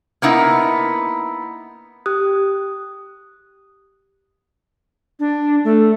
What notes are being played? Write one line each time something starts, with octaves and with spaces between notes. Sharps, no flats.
A#3 B3 D#4 E4
G4 D#6 F#6
D4
A3